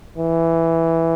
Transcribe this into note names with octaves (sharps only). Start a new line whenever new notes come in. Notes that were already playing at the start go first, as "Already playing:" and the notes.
E3